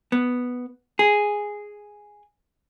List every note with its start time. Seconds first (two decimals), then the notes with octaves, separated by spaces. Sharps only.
0.12 B3
0.99 G#4